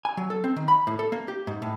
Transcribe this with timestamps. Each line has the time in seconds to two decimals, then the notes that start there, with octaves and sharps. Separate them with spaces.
0.05 G#5
0.17 F#3
0.30 A4
0.44 C4
0.56 D#3
0.68 B5
0.87 A2
0.99 A4
1.12 A#3
1.28 G4
1.47 G#2
1.62 A2